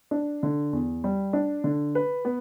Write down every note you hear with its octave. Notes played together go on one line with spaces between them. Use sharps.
D4
D3
E2
G3
D4
D3
B4
B3